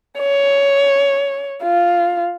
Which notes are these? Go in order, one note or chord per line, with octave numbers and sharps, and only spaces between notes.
C#5
F4